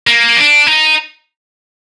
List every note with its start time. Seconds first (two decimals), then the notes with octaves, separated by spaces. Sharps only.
0.07 A#3
0.37 D4
0.67 D#4